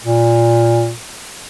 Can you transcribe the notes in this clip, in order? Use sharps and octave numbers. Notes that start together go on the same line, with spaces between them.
A#2